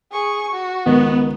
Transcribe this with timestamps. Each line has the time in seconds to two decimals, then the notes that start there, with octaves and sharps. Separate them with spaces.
0.12 G#4 C#6
0.52 F#4
0.86 C#2 D#3 B3